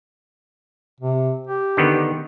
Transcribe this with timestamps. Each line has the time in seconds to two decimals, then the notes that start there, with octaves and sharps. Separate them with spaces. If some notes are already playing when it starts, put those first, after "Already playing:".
1.01 C3
1.47 G4
1.77 D3 D#3 B3